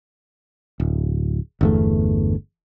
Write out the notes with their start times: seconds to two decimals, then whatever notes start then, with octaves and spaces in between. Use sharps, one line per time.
0.80 D1
1.61 G1 E2 A3